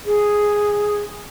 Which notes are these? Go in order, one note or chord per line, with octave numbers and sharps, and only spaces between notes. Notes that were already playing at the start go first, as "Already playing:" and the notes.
G#4